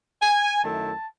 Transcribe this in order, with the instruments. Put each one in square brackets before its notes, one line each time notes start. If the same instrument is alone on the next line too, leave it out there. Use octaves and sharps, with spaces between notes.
[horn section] G#5
F#2 D#3 A3 E4 A5